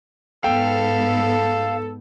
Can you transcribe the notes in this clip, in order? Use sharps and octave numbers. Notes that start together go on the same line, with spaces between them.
G#2 B3 A4 F5 G5